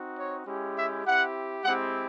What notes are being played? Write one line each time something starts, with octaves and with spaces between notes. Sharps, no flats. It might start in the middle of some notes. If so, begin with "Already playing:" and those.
Already playing: C4 D#4 F#4
C#5
G#3 C#4 E4 G4
E5
C4 E4 G4 F#5
G#3 C4 E4 G4 F#5